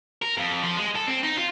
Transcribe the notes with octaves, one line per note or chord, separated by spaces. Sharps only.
A#4
F2
F3
G#3
A4
C4
D#4
F4